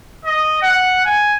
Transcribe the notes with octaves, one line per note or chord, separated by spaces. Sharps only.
D#5
F#5
G#5